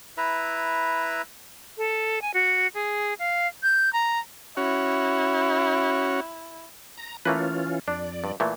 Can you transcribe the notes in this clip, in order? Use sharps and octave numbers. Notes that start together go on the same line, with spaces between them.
E4 B4 E5 A#5
A4
G#5
F#4
G#4
F5
G6
A#5
C#4 E4 F#4 C#5
A#5
E3 A3 A#3 C#4 F4 B4
F2 D4 D5
G2
A#2 E3 A3